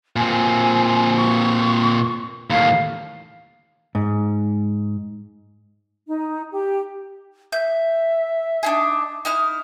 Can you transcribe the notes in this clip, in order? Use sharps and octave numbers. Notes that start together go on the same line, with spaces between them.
A#2 C4 G#5
C#6
D#2 A2 F5
G#2
D#4
G4
E5 G6
D4 D#4 G#4
D#4 E4 F6